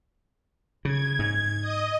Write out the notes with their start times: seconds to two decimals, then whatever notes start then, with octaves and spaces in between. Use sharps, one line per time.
0.85 C#3 G#6
1.19 G#2
1.61 D#5 D#6